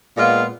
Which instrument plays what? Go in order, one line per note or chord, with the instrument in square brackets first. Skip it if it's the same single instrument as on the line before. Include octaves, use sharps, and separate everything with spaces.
[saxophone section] A#2 G#3 B3 F4